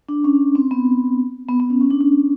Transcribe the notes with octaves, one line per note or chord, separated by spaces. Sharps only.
D4
C#4
C4
B3
B3
B3
C#4
C#4
D4
D4